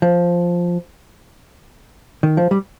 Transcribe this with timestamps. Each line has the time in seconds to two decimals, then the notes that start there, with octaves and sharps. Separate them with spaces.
0.02 F3
2.23 D#3
2.37 F3
2.51 G3